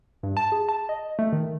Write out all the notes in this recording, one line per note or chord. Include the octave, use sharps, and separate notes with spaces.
G2
A5
G#4
A5
D#5
A3
D#3